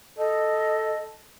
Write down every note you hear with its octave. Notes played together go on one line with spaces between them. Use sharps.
A4 D#5